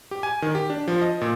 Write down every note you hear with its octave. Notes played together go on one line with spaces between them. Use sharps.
G4
G#5
D#3
G4
D4
F3
D#5
A#2